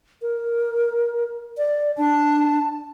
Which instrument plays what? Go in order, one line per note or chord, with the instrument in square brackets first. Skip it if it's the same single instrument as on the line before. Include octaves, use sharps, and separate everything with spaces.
[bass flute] A#4
D5
[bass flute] D4 [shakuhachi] A5